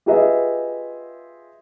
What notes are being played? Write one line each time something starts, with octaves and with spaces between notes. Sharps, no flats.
F4 G4 G#4 B4 D#5 E5